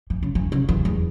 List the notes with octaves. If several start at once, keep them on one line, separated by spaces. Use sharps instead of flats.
E3
C#3
E3
C#3
E3
E2